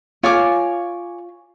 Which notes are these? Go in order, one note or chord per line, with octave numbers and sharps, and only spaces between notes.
F4 C#5 G#5 D6